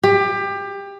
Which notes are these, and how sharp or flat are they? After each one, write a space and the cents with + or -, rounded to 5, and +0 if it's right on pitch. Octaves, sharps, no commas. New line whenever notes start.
G4 +25